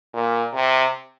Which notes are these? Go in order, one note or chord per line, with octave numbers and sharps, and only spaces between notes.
A#2
C3